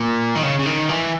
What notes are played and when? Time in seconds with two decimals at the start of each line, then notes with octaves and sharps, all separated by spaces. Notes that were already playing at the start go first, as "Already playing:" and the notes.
Already playing: A#2
0.35 D#3
0.43 C#3
0.59 C#3
0.66 D#3
0.89 E3